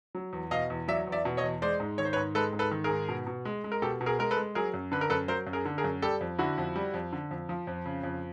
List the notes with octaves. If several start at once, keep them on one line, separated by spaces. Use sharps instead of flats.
F#3
E2
B2 D#5 F5
E2
F#3 D5 E5
E2
D5 E5
B2
C#5 D#5
E2
G#3 C5 D5
G#2
D#3 C#5
C5
B4 C#5
G#2
G#3 A4 B4
G#2
A4 B4
D#3
G#4 A#4
G#2
B2
B2
G#3
G#3
A#4
B2 G4 A4
B2
G#4 A#4
G#3 A#4
A4 B4
G#3
F#3 G#4 A#4
F#2
D3 B4
A#4
F#2 A4 B4
F#3 A#4 C5
F#2
G#4 A#4
D3
G#4 A#4
F#2
G3 G4 A4
F2
D3 E4 F#4
F2
G3
F2
D3
F2
F3
F2
C#3
F2